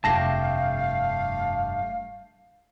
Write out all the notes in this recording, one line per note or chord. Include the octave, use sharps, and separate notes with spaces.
F1 G2 A3 G4 F5 A5 A#6 C7